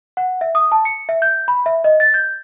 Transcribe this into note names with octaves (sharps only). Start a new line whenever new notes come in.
F#5
E5
D#6
A5
C#7
E5
G6
B5
E5
D#5
A6
G6